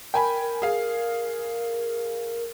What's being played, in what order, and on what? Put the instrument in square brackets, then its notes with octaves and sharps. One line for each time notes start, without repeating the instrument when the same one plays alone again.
[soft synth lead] A#4 [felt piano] G5 G#5 B5
[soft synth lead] A#4
[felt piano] G#4 F5